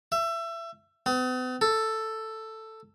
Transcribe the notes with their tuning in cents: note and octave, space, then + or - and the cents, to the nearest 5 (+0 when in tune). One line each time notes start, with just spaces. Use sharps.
E5 +25
B3 +45
A4 +5